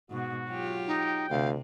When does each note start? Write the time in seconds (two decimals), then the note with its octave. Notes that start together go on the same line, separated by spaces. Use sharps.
0.10 G#2 B2 F#4
0.48 F#3 F4 G4
0.87 D#4 G5
1.30 D2 C3 F5